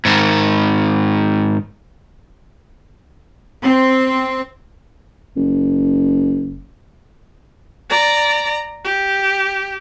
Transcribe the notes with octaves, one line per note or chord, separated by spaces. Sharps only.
G#2 D#3
C4
F#1
D5 A#5
G4